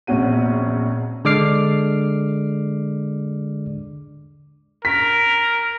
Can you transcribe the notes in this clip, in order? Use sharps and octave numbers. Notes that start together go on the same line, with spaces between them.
A#1 E2 C4 C#4 F#4 D#7
D3 G#3 D5 D6 F6 C7
A#4 B6